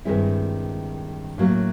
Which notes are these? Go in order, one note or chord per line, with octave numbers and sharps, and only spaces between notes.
G2 D#3 G#3 C4 E4
A2 F#3 A#3 C#4